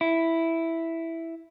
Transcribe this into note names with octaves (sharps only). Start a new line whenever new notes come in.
E4